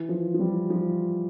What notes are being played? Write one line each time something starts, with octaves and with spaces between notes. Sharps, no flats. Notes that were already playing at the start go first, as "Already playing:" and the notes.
Already playing: E3
F3
F3
G3
F3